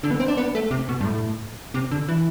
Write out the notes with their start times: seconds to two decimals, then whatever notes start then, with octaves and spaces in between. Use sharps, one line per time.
0.03 D3
0.11 B3
0.20 C4
0.28 D4
0.37 B3
0.55 A3
0.71 C3
0.89 B2
1.01 G2
1.05 A2
1.74 C3
1.91 D3
2.09 E3